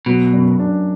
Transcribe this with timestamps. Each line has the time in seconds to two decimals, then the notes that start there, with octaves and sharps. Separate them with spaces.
0.06 B2 F#3
0.33 F#2
0.59 D4